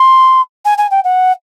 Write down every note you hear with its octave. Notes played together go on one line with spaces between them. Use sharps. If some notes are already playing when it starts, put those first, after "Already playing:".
Already playing: C6
G#5
G#5
G5
F#5